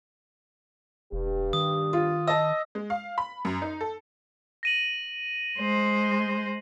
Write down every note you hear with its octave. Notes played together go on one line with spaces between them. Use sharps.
E1 G2 G4
D#3 D#6
F4
D#5 A5 E6
G#3
F5
B5
F#2
D#4
A4
A#6 D#7 F#7
G#3 C5